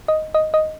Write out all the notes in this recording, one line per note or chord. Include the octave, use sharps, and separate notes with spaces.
D#5
D#5
D#5